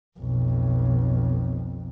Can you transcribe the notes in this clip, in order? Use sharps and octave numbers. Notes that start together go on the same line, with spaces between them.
B1 F2